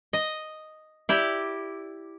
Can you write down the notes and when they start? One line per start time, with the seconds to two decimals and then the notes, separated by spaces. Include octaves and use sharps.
0.13 D#5
1.09 E4 G4 D5